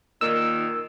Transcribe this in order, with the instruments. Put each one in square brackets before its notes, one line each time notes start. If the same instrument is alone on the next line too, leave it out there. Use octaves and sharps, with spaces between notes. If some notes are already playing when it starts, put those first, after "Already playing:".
[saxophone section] A#2 D#3 D#4 [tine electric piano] E6